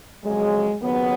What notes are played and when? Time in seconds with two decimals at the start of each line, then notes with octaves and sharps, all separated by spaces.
0.25 F2 C#3 F#3 G#3
0.81 D#2 C#3 F#3 B3